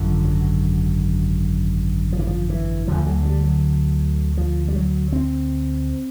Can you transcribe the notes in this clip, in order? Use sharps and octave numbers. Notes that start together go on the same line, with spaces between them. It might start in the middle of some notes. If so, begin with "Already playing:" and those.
Already playing: G#1 F#2 D3 F3
F#3
F3
E3
F3
E3
D2 D3 F3
F#3
G3
F#3
F3
G3
F#3
C4